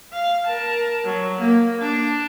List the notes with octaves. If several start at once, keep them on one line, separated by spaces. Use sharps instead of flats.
F5
A#4 A5
F#3
A#3
D4